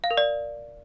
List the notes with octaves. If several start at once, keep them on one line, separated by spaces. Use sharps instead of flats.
F5
A#4
D5